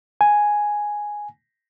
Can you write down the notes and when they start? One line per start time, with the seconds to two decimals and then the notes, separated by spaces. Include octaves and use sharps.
0.21 G#5